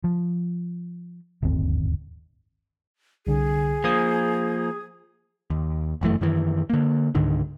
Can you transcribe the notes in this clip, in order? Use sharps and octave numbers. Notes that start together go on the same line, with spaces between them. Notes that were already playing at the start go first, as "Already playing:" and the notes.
F3
D1 G1 D#2 C4
C2 D3 G#4
F3 A#3 D#6 G#6
D#2
G1 F#2 E3 A3
F#2 D#3 E3
D3 A#3
C#2 G#2 D3 D#3